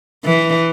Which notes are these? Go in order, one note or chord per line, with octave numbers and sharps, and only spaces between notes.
E3